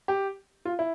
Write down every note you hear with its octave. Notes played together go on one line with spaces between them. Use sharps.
G4
F4
E4